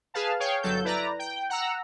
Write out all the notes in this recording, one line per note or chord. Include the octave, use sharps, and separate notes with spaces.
G#4 B4 F5 A5
G#4 C#5 F5 G5
G1 F#3 A4 G6
E4 B4 D5 A#5
G5
F#5 A#5 E6